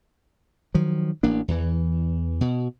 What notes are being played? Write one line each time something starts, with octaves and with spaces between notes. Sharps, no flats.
D#3 F3 F#3
A1 A#3 D4
E2 E3
B2